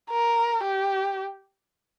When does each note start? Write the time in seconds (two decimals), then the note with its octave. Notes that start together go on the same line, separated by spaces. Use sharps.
0.10 A#4
0.64 G4